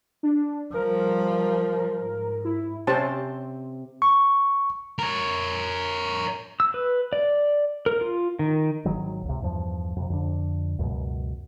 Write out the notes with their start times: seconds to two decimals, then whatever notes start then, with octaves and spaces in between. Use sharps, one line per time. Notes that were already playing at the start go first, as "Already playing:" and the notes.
0.23 D4
0.74 F3 G3 A#4
1.98 G#2
2.45 E4
2.87 C3 C4 C#4 C5 A5
4.02 C#6
4.98 A#4 C#5
6.60 E6
6.74 B4
7.13 D5
7.86 A#4
8.01 F4
8.39 D#3
8.85 G#1 D#3 F#3
9.25 C#2 C3
9.42 E2 G2 F3
9.96 F2 C3
10.10 F2 D3 D4
10.79 C#2 F#2 B2